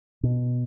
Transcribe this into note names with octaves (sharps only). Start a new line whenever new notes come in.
B2